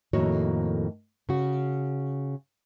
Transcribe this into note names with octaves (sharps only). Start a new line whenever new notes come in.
F2 A2 D#3 A#3 F#4 C#5
C#3 F#4